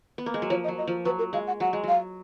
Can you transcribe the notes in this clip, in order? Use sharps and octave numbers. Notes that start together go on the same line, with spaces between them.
B3
A#3
G#3
F#3
F3 C#5
D#5
F#3
D#5
F3
F#3 B4
A#4
G#3 F5
F#5
F#3 F#5
G#3
F#3 F5